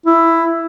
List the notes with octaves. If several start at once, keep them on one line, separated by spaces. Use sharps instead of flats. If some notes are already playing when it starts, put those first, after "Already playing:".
E4